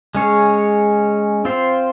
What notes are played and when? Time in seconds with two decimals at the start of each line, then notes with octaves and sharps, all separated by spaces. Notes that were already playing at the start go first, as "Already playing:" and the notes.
0.15 G#3 C#4 G#4 C#5
1.45 C4 F4 C5